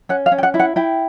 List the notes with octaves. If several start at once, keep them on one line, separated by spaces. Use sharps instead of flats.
C#4 F#5
F5
C#4
G5
F#5
E4
F#5
E4 G5